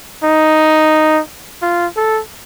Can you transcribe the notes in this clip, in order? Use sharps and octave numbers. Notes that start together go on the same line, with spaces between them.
D#4
F4
A4